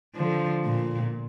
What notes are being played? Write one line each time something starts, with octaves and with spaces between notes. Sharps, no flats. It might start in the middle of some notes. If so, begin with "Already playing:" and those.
D3 F3
A#2